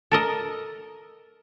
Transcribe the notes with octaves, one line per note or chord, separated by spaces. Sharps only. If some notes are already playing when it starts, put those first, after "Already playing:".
A4 A#4 D#5